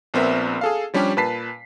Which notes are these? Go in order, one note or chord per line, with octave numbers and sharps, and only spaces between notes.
A#1 B3 C4 A#4 E5
G#4 A4 F5
F3 G3 C#4 D4 G4
A#2 B4 A5 B6 C7